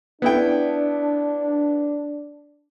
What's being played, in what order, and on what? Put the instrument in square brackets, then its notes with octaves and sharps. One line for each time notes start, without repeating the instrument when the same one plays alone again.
[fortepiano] B3 E4 G5 [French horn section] D4